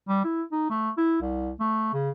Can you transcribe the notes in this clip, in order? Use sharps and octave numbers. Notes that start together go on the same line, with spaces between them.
G3
E4
D#4
A3
E4
C2
A3
C#3